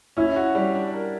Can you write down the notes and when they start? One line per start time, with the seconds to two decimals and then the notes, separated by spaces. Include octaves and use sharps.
0.17 C#4 E4
0.36 F#4
0.55 G3
0.75 D4
0.94 A#4